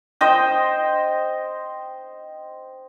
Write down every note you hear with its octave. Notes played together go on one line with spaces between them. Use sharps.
C5 D#5 G5